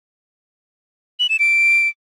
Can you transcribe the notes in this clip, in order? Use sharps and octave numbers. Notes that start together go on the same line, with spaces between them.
F#7
E7
D7